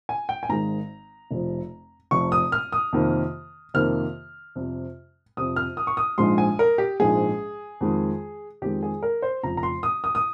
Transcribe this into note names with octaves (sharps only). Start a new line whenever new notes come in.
G#5
G5
G#5
G#1 G#2 D#3 G#3 A#5
F1 F2 C3 F3
F1 F2 C3 F3 C#6
D#6
F6
D#6
F2 C3 D#3 A#3
F2 C3 D#3 A#3 F6
F2 C3 G3
F2 C3 G3 D#6
F6
D#6
C#6
D#6
A#1 G#2 F3 G#3 C6
G#5
A#4
G4
A#1 G#2 F3 G#3 G#4
F2 D#3 G#3
F2 D#3 G#3 G4
G#4
A#4
C5
F1 F2 C#3 F3 A#5
A#5
C6
D#6
D#6
D#6